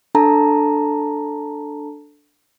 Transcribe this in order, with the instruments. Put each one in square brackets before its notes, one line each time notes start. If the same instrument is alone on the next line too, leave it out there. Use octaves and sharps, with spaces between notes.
[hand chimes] D4 A4 A5 A#5